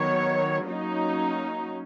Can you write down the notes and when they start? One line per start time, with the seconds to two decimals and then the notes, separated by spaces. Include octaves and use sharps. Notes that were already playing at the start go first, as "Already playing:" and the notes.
Already playing: D#3 F#3 B3 C#5
0.66 F#3 A#3 C#4 D#4